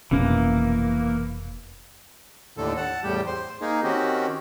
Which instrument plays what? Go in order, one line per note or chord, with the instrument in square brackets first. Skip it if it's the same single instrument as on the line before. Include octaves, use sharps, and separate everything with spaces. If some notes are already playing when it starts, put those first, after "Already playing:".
[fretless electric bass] F1 B2 C#4 [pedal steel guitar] E3 A#3
[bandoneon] D#2 A2 D3 A4
F#5 A5
E2 A2 G3 G4
C5
A#3 D#4 G#4
D#3 C4 C#4 F#4 G4